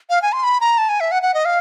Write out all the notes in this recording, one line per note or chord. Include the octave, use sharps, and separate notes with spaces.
F5
G#5
C6
B5
A#5
A5
G#5
E5
F#5
F#5
D#5
F5